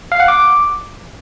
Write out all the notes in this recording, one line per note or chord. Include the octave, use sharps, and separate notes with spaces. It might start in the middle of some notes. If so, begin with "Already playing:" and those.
F5
F#5
D6